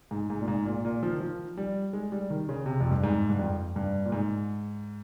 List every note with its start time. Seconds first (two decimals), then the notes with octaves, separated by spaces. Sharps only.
0.11 G#2
0.30 G#2
0.41 A#2
0.48 G#2
0.65 A#2
0.85 A#2
1.03 F3
1.12 D#3
1.21 F3
1.57 G3
1.93 G#3
2.12 G3
2.30 D#3
2.49 C#3
2.66 C3
2.80 F2
2.91 G2
3.04 G#2
3.29 G2
3.39 F2
3.76 G2
4.05 A#2
4.12 G#2